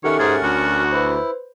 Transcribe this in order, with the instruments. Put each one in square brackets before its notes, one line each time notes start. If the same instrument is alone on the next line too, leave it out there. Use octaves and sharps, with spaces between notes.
[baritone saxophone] D#3 [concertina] C#4 A#4 F#5 [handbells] G4 A4 E5 [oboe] C#6
[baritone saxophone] G#2 [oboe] G#4 [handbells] A6
[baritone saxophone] D2 [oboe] F#4
[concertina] E4 [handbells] B4 C5